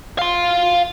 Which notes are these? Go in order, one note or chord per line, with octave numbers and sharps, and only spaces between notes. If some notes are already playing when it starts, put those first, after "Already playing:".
F5 C6